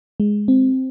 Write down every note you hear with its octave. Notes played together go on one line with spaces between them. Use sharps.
G#3
C4